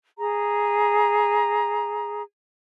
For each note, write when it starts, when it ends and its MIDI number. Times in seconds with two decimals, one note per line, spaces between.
0.18 2.22 68
0.18 2.22 82